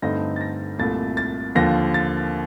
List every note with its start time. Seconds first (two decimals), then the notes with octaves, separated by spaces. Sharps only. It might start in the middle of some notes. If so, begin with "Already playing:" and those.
0.02 G2 D3 A3 C4 D#4 A#6
0.36 A6
0.41 A#6
0.79 C2 A#2 A3 A6
1.17 A6
1.55 D#2 D3 F3 A#6
1.94 A6